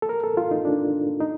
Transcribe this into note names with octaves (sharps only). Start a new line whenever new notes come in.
A4
A#4
A4
F4
D#4
D4
D#4